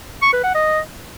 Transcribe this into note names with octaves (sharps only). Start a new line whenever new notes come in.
C#6
B4
F#5
D#5